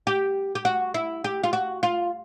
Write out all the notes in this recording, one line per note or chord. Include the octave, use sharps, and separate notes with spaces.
G4
G4
F#4
E4
G4
F4
F#4
F4